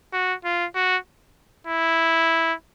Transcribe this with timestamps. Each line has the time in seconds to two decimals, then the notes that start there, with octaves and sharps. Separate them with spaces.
0.13 F#4
0.44 F4
0.75 F#4
1.67 E4